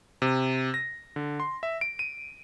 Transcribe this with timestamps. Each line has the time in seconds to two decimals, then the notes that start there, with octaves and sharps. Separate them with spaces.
0.22 C3
0.74 A#6
1.16 D3
1.40 C6
1.63 E5
1.81 D7
1.99 D#7